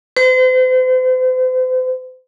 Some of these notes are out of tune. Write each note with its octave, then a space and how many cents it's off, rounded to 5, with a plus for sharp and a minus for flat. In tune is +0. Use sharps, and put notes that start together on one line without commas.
C5 -40